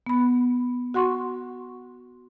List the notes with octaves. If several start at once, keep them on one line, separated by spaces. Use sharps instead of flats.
B3 B5
F#4 F#5 C6 C#6